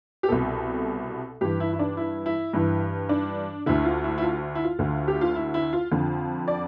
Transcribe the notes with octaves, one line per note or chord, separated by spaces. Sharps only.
G4
C2 B2 A4
G2 E3 G4
E4
E4
D4
E4
E4
G2 E3 E4
D4
D2 D3 E4
F4
E4
E4
F4
E4
F4
D2 D3
G4
F4
E4
E4
F4
F2 D3 F4
D5